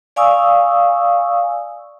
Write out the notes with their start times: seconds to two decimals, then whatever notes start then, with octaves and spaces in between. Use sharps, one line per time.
0.16 D5 F5 G#5 C#6 D#6 E6